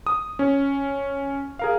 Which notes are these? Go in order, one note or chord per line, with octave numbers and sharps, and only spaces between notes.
D#6
C#4
G#4 A#4 F5